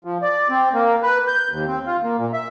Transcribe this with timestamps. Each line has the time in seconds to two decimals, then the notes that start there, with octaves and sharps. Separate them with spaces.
0.05 F3
0.22 D5
0.50 C4
0.74 A#3
1.03 B4
1.28 G6
1.51 D#2
1.68 C4
1.86 F4
2.04 A#3
2.18 A#2
2.33 E5